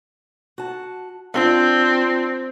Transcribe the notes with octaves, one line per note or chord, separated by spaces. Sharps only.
F#4 A5
C4 D4 F4 D5